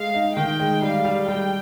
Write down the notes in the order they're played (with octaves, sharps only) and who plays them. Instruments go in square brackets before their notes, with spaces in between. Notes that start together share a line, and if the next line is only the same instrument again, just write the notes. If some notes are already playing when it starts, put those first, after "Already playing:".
Already playing: [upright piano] G#3 [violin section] F5
[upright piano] D#4
[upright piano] D#3 [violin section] G5
[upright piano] G#3
[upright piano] G3 [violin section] F5
[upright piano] G3
[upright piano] G3 [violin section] G5